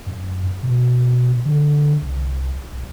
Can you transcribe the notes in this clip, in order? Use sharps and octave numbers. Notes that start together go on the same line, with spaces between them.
F#2
B2
D3
C2
B1